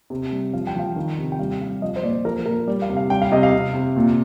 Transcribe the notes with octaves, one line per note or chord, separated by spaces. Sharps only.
C3
G3
F3 F5
G5
F3 F5
D#3
C3
G5
G3 F5
G3 F5
F3 D#5
C5
A#2 D5
F3 A#4
A#2 A#4
G3 D5
F5
C3
F5
G3 G5
F5
C3 D#5
F5
C3
C3
A#2